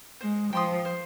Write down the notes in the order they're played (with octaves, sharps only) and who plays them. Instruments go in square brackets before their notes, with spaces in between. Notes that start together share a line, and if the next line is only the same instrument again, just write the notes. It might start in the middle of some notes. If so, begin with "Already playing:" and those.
[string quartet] G#3 [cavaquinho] C5
[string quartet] F3 [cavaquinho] G5 C6 D#6
[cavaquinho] C5